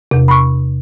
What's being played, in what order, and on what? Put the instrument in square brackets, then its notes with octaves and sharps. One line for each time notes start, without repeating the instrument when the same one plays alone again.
[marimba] E2 C3
B5 C#6